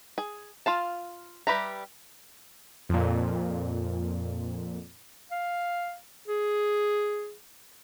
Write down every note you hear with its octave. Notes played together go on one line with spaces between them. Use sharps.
G#4
F4 F5 A5
G3 G4 B4 E5 A#5
F2 A#2
F5
G#4